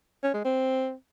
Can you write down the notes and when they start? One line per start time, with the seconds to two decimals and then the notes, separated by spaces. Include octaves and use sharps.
0.23 C#4
0.34 G#3
0.45 C4